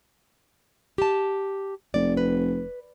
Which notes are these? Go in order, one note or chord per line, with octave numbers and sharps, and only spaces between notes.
G4 A5
F1 D5
B4